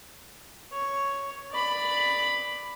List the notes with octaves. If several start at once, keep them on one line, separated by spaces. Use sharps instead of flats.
C#5
D5 B5